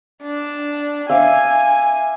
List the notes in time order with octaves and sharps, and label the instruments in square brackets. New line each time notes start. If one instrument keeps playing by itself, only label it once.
[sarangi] D4
[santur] E5 F5 D6 [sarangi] G#5